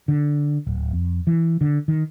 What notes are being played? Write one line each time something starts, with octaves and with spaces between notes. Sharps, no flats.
D3
D1
F2
E3
D3
D#3